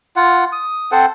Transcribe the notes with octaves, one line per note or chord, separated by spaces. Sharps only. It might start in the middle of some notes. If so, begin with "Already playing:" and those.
F4 F#5
D#6
C4 A4 C5 F#5